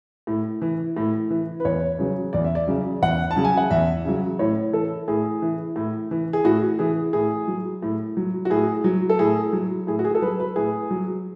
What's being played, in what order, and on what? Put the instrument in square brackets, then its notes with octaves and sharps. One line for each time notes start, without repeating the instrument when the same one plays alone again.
[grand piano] A2
E3
A2
E3
B4
E2 C#5
C#3 F#3
E2 D5
E5
D5
C#3 F#3
E2 F#5
A5
C#3 F#3
G#5
F#5
E2 E5
C#3 F#3
A2 C#5
E3 A4
A2 G#4
E3
A2
E3
G#4
A2 F#4
E3 G#4
A2 G#4
F#3
A2
F#3
F#4
A2 G#4
F#3
A4
A2 G#4
F#3
A2 G#4
F#4
G#4
A4
F#3 B4
B4
A2 G#4
F#3